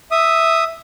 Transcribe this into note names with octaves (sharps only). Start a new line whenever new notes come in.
E5 D#6